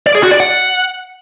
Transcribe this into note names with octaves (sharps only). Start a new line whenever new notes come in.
D5
G#4
F#4
D5
F#5